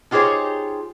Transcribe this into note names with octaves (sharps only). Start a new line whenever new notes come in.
D#4 F4 G4 G#4 C5 C#5